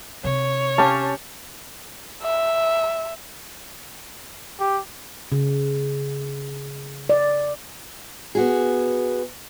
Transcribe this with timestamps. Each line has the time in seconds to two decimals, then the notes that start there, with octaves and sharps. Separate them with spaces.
0.24 C3 C#5
0.78 C#4 G4 F5 A5
2.23 E5
4.60 G4
5.32 C#3
7.09 D5
8.35 B3 F#4 G#4